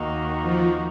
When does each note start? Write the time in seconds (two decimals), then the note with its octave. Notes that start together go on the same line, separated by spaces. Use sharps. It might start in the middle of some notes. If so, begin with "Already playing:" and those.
Already playing: D#2 D#3 A#3 D#4 F#4
0.42 F3